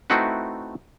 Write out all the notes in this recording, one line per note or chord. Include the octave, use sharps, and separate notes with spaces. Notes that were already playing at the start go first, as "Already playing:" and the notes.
A3 C4 D#4 E4 F#4 B4